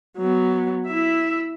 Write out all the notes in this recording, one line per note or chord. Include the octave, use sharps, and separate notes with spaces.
F#3 B3
E4 E5